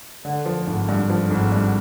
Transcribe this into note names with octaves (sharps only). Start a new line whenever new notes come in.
D3
F3
G#1
G2
F3
G#1
G2